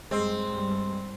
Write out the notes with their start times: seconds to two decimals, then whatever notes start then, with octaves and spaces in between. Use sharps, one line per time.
0.11 G2 G#3 C4
0.48 G2 G3